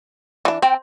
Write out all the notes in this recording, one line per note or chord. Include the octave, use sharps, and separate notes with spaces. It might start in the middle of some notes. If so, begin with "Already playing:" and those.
E3 D4
C4 G5